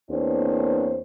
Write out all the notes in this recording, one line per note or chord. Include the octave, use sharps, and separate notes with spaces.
E2 A#3 C4 D4 C5 C#5